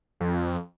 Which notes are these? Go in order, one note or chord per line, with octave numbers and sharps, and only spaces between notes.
F2